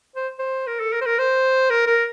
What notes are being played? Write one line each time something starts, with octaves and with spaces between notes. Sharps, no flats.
C5
C5
A#4
A4
A#4
C5
A#4
C5
A#4
A#4